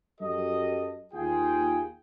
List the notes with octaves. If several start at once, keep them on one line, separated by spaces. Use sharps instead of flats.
F#2 F#3 G4 A4 D#5
D#2 F4 G#4 G5